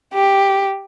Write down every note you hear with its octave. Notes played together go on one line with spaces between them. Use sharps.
G4